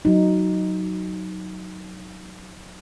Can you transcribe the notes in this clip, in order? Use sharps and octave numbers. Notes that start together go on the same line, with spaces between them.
F#3 D#4